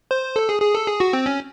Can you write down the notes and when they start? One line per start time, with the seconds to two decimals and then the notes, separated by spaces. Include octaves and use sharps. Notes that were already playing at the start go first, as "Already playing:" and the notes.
0.11 C5
0.36 A4
0.49 G#4
0.62 G#4
0.75 A4
0.87 G#4
1.00 F#4
1.13 C4
1.26 C#4